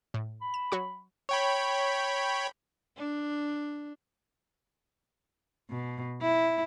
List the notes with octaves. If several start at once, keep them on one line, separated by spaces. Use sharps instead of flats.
A2
B5
E7
F#3 F#4 C#6
C#5 G5 B5
D4
B2
E4